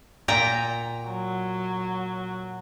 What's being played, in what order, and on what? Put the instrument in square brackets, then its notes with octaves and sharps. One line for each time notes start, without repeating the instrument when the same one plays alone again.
[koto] A#2 G5 A#5
[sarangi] F#3